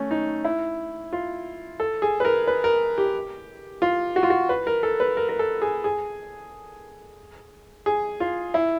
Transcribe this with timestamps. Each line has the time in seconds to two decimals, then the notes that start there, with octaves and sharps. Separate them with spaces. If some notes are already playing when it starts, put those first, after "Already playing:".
Already playing: A3 C#4
0.11 D#4
0.44 E4
1.13 F4
1.80 A4
2.02 G#4
2.20 B4
2.25 A#4
2.47 B4
2.64 A#4
2.98 G4
3.82 F4
4.16 F#4
4.23 F4
4.30 F#4
4.49 B4
4.67 A#4
4.83 A4
5.00 B4
5.17 A#4
5.29 A#4
5.39 A4
5.62 G#4
5.84 G#4
7.86 G#4
8.20 F4
8.54 E4